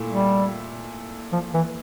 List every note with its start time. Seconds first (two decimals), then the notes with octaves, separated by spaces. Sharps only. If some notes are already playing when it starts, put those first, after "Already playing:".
Already playing: A#2 A3 E4 A4
0.09 G3
1.33 F3
1.54 E3